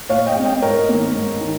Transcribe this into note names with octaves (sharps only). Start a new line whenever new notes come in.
A#2 C#5 F5
D#5 G5
G#3 C4
D#5 G5
G#2 A#4 C#5
D#3 A#3
G#2
D#3